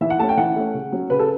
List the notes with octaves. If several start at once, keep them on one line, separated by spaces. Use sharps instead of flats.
E3 E5
F#5
A3 C#4 A5
G5
E3 F#5
A3 C#4
C#3
F#3 C#4
C#3 B4
A4